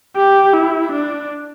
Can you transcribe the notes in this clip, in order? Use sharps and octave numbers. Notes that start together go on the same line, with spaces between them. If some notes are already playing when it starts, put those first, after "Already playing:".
G4
E4
D4